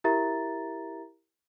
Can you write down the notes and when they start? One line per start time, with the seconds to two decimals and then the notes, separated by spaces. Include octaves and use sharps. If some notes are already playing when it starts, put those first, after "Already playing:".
0.04 E4 G4 A#4 E5 A#5 A6